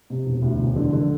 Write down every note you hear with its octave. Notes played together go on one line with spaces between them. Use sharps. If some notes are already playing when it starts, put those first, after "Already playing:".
C3
E1
D2
E1
D3
D3